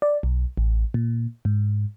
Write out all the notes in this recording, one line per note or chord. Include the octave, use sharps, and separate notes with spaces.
D5
B1
A1
A#2
G#2